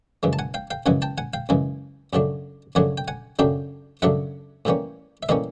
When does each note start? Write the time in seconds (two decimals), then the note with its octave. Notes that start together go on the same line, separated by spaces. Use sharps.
0.23 F#2 C#3 E3 G#3
0.33 A5
0.39 F#5 G#5
0.54 F5 G5
0.71 F5 G5
0.86 F#2 C#3 E3 G#3 F#5 G#5
1.02 G5 A5
1.18 F#5 G#5
1.34 F5 G5
1.49 F#2 C#3 E3 G#3
2.13 F#2 C#3 F#3 A3 D4
2.75 F#2 C#3 F#3 A3 D4 F#5 G#5
2.98 G5
3.08 F#5 G#5
3.39 F#2 C#3 F#3 A3 D4 F5 G5
4.02 F#2 C#3 F#3 A3 D4 E5 F#5
4.65 A2 E3 G3 A#3 C#4
5.23 E5
5.29 A2 E3 G3 A#3 C#4 D#5 F5